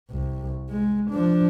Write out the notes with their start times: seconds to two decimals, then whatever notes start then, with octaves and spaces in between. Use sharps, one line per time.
0.10 C2
0.70 G#3
1.10 F3 D4